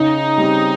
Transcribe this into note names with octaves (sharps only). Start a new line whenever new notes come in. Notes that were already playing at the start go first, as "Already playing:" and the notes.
Already playing: C#3 D#4
G3 C4 G4